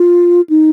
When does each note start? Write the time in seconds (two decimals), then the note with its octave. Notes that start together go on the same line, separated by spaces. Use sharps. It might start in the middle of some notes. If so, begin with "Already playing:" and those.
Already playing: F4
0.50 D#4